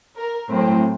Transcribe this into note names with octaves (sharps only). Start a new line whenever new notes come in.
A#4
A2 F#3 C4